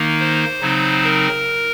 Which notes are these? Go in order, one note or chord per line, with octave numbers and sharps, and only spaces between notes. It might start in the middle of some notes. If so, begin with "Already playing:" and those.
Already playing: D#3 A#3 D#4
C5
C#3 F#3 C4 D#4
A#4